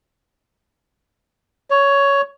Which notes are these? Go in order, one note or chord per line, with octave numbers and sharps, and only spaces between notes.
C#5